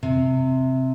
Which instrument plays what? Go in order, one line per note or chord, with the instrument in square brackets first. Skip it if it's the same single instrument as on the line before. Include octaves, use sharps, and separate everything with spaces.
[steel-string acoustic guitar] C3